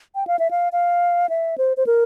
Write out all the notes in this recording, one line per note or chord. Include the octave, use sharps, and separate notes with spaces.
G5
F5
E5
F5
F5
E5
C5
C5
A#4